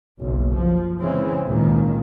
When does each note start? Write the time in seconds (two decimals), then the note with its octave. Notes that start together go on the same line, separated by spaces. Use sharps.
0.19 F#1 B1
0.52 F3
0.99 C#3 E3 G#3 C4
1.44 G#1 C#2 A#2 D#3